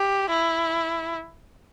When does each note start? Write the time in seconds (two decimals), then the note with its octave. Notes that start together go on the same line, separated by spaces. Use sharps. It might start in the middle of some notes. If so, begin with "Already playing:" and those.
Already playing: G4
0.29 E4